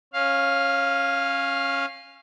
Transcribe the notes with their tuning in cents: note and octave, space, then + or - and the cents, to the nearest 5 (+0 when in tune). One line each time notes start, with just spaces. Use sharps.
C#4 -15 F5 +0